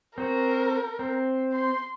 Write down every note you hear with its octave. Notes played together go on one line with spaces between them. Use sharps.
C4 F#4 A#4
C4
C6